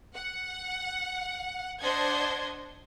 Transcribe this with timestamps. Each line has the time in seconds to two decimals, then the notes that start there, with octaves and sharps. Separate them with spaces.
0.14 F#5
1.80 D4 C5 D#5 F#5 G#6